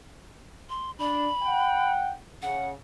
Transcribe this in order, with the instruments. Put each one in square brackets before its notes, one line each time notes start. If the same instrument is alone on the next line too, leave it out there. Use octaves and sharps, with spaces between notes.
[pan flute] C6
[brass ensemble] D4 [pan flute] B5
[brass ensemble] F#5 G5
[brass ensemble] C#3 [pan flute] F#5